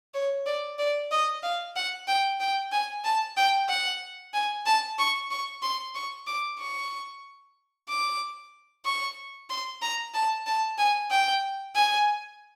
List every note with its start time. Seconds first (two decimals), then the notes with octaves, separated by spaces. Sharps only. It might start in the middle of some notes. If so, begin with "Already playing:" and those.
0.14 C#5
0.46 D5
0.79 D5
1.11 D#5
1.43 F5
1.76 F#5
2.08 G5
2.40 G5
2.72 G#5
3.04 A5
3.37 G5
3.69 F#5
4.34 G#5
4.66 A5
4.99 C#6
5.31 C#6
5.62 C6
5.95 C#6
6.27 D6
6.59 C#6
7.88 D6
8.85 C#6
9.50 C6
9.82 A#5
10.14 A5
10.46 A5
10.78 G#5
11.11 G5
11.75 G#5